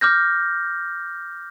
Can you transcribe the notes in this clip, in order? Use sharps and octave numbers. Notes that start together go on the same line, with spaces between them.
D6 F6 G6 A#6